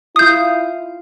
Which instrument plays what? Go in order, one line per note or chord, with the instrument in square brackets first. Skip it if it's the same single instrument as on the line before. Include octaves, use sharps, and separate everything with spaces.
[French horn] E4 [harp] F4 C7 D#7 [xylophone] D#6 G6